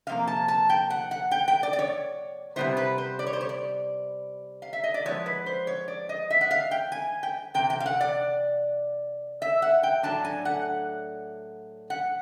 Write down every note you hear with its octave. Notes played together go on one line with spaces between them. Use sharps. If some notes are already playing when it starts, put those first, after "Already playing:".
C3 F3 A#3 F5
A5
A5
G5
F#5
F#5
G5
G5
D5
D5
C#5
C3 D#3 G3 B3 E4 C5
B4
C5
D5
C#5
C5
C#5
D5
F5
E5
D#5
D5
F3 G#3 B3 E4 C#5
B4
C5
C#5
D5
D#5
E5
F#5
F5
G5
G#5
G5
C3 E3 G5
G5
F5
F#5
D5
E5
F#5
G5
A2 F#3 A3 D4 A5
G#5
F#5
F#5